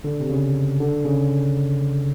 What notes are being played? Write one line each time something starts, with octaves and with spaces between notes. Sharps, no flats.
D3
C3
C#3
D3
C#3